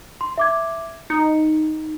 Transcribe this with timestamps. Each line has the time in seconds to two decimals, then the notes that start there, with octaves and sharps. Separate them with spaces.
0.21 C6
0.38 E5 D6 G#6
1.10 D#4 C#7